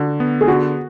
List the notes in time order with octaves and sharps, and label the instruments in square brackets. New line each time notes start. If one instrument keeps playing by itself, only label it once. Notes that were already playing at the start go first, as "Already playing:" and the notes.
Already playing: [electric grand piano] D3 [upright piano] F#4
[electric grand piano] B3
[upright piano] G#4
[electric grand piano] D3 [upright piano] F#4